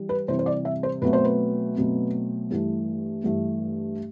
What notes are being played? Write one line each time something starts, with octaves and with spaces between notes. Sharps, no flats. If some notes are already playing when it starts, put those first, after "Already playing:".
Already playing: E3 G3
B4
C3 E3 G3 C5
C5
D5
E5
C5
B2 F#3 A3 C4 B4
C5
B4
B2 F#3 A3 C4
G2 E3 A3
G2 E3 A3